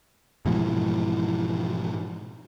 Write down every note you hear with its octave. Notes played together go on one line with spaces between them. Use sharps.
G#2 B2 E3 F3